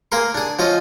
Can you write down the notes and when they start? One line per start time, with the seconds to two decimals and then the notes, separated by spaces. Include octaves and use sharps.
0.12 A#3 G#4 A#4 C6
0.34 D4 G#4
0.59 F3 C#4 F4 D#5